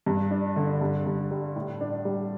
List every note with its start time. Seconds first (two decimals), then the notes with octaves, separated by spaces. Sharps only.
0.06 G2
0.31 D4
0.56 D3
0.81 G2
1.06 G2
1.31 G3
1.56 A2
1.81 D4
2.05 G3